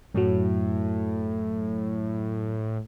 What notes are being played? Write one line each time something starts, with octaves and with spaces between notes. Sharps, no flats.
F#2 A2 F#3